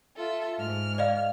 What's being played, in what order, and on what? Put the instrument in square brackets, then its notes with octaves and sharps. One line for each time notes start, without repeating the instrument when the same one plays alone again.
[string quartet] F4 A4 E5
G#2 F6
[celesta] D5 D#5 F5